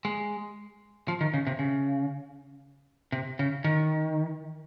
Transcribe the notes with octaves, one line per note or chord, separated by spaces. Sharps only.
G#3
F3
D#3
C#3
C3
C#3
C3
C#3
D#3